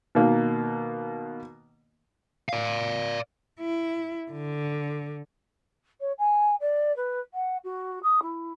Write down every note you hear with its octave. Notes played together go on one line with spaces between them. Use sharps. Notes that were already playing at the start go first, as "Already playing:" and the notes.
B2 D#3 A#3
D5 F5
E4
D3
C#5
G#5
D5
B4
F#5
F#4
D#6
E4